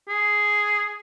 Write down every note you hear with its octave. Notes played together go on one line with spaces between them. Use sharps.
G#4